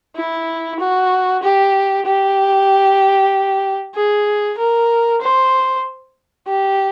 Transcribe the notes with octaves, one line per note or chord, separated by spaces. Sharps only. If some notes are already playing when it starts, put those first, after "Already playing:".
E4
F#4
G4
G4
G#4
A#4
C5
G4